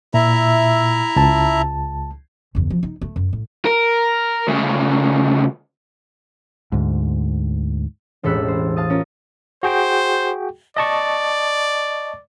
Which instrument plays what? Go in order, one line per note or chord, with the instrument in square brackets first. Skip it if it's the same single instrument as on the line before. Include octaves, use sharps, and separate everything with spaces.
[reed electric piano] A#2 [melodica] E4 E5 A#5
[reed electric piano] C#2 A5
[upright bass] F#1 E2
F3
D#4
A3
F#2
A2
[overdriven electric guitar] A#4
D2 C#3
[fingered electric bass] D2 G#2
[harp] E1 A1 A4 B5 E6 F#6
C5
F5 A5 D#6
C#4 F4 A#4
[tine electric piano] F#4 G#4 G5 [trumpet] C5
[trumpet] D5 [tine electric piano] D#5 A5 C#6